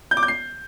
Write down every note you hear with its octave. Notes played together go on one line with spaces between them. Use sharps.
G6
D6
G6
C7